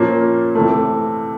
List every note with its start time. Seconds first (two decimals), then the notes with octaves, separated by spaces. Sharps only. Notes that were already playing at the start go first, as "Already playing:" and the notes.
Already playing: A#2 F3 A#3 C#4
0.55 C3 E3 A3